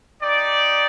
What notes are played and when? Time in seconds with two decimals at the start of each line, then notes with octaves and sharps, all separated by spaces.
0.22 D#4 G4 D5